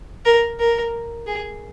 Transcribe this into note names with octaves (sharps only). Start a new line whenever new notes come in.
A#4
A#4
G#4